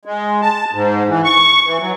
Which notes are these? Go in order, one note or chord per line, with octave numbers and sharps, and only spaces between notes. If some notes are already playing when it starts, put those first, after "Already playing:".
G#3
A5
G#2
E3
C#6
E3
F#3